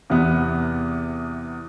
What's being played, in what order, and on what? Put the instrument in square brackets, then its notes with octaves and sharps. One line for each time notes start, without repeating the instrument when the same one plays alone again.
[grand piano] E2 C3 B3